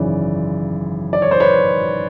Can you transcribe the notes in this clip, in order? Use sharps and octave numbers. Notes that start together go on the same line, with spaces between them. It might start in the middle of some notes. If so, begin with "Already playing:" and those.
Already playing: G#1 F#2 C#3 E3 D5
D5
C#5
C5
B4 C#5